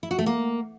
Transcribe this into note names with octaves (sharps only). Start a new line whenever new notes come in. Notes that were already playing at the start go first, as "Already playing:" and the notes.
E4
F#4
A3
A#3